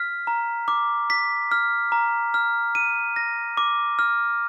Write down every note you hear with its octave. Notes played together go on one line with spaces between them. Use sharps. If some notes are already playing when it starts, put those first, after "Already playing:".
Already playing: F6 B6
A#5
D6
B6
F6
A#5
F6
D#7
A#6
D6
F6